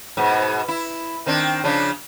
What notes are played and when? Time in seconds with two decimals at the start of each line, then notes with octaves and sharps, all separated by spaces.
0.17 G#2 B2
0.68 E4
1.26 D#3 C4 D4
1.64 C#3 F3 D4